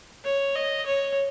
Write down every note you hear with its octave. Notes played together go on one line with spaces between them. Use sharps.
C#5
D#5
C#5